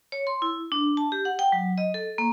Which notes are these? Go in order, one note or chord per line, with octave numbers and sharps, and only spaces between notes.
C#5
C6
E4
D4
A5
G4
F#5
G5
F#3
D#5
A4
A#3